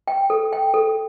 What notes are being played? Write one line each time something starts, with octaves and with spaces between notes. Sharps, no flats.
G5
A4
G5
A4